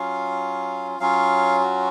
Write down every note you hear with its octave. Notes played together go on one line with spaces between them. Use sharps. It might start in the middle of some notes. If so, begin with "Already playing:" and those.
Already playing: F#3 C#4 F4 F5
F#3 C#4 F4 F5
F#4